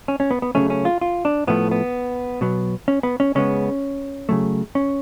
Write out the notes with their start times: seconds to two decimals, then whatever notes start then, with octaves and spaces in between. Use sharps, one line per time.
0.08 C#4
0.20 C#4
0.31 B3
0.42 B3
0.55 C#3 F#3 A3 C#4
0.70 C#4
0.85 F4
1.01 F4
1.25 D4
1.47 A2 F3 A3 B3
1.71 B3
2.41 B2 F#3 B3
2.88 C#4
3.03 B3
3.20 C#4
3.35 C#3 G#3 B3 C#4
4.29 C#3 F#3 A3
4.75 C#4